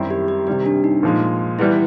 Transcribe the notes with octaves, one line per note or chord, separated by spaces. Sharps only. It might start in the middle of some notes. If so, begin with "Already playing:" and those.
Already playing: F#2 D#3 G3 C4 E4
G4
G4
C3 D#3 G3 G4
D4
D#4
A#2 F3 G#3
E3 G3 B3 E4